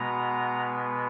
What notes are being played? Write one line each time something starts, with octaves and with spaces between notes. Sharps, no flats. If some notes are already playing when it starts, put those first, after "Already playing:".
Already playing: B2 G#3 B3 A#5